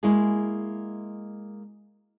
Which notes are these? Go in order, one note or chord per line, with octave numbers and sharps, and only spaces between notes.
G#3 A#3 E4 F#4 G#4